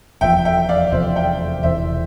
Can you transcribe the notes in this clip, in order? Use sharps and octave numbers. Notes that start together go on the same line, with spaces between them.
F1 E2 C3 F3 E5 G5
E5 G5
D5 F5
F1 E2 C3 F3 C5 E5
E5 G5
E1 E2 E3 C5 E5